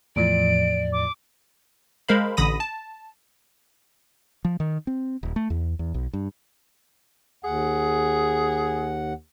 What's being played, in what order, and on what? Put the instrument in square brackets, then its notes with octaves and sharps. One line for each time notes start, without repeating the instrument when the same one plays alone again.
[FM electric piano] E2 A2 F3 [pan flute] D5 [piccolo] D7
[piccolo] D6
[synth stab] G#3 A#4 C5 F5 B5
A1 D3 B5 D#6 A#6 D#7
A5
[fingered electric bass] F3
D#3
C4
D#1
A3
E2
E2
B1
G2
[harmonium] D#2 F#5 [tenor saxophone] G#4